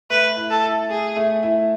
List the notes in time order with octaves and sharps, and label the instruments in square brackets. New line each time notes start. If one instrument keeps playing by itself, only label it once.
[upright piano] A3 [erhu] B4
[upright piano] E4
[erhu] A4
[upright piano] E4
[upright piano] A3 [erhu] G#4
[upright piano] A3
E4